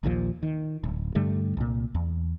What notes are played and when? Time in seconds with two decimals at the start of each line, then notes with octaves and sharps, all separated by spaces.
0.03 A#1 D#2 A#2 F3
0.43 D#3
0.84 D1
1.15 G2 D3 G3 A3
1.57 C2 A#2
1.95 E2